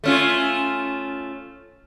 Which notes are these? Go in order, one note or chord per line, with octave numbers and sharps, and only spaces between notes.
A3 C#4 F4